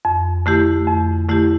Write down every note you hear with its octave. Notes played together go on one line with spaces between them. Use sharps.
F2
D3 A3 E4 G4
F2
D3 A3 E4 G4